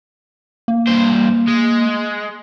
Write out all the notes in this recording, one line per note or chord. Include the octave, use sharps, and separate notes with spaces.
A#3
G2 C5
G#3